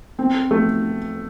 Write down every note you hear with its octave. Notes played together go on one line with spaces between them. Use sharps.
C4
A3